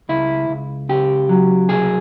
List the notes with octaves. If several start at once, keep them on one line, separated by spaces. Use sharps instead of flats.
C#2 E4
C#2
C#3 G4
F#3
C2 G#4